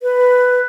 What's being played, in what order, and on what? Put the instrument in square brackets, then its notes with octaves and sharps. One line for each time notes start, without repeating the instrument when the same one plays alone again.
[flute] B4